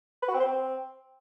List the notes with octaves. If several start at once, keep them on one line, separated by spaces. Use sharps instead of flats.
B4
F#4
C4
C5
C4